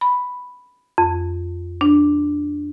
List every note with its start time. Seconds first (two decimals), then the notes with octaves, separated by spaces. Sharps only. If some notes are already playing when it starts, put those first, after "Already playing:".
0.01 B5
0.98 F2
1.81 D4